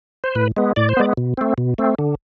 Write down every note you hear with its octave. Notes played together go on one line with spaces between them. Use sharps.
C5
A2 B4
G#3 B3
A2 D5
C5
G#3 B3 D5
B2
A3 C4
B2
A3 C4
D3